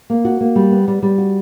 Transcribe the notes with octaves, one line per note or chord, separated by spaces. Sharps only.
A#3
F#4
A#3
G3
B3
G3
G3
F#4